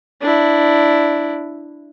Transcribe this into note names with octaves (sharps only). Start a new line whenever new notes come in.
D4 E4